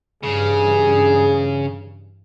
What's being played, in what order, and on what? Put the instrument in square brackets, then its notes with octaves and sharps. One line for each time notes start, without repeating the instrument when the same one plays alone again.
[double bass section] G2 E3 [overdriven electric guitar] C#3 [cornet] G#4